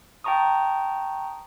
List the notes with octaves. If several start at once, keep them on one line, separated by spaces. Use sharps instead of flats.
G5 A5 A#5 C#6 D#6